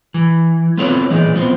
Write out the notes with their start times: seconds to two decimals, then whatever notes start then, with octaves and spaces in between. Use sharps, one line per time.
0.14 E3
0.77 B3 C4 F4 A4 B4 C#5
1.10 A#2 D#3 E3 G#3
1.34 F3 B3 C4